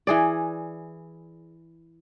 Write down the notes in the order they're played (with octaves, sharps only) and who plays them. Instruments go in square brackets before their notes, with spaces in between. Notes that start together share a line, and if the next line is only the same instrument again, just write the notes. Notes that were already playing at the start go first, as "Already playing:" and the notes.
[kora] E3 G#4 D5